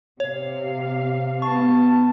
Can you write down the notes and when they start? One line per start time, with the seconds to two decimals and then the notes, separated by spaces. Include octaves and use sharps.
0.20 C3 C#5 F5
1.42 B3 A5 C#6